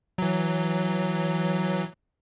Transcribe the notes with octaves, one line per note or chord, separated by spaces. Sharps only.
E3 F#3